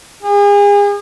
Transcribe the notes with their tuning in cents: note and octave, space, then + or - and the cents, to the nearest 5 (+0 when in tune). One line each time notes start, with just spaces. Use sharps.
G#4 -35